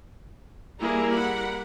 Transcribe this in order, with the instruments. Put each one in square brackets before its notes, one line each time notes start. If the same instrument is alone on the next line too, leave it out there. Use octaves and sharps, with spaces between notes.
[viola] G3 A#4 [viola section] A#3 E4 G#4
[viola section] F#5 B5